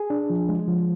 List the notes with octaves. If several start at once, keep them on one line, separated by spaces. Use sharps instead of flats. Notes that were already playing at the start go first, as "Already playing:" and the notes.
Already playing: G#4
D4
F3
G#3
F3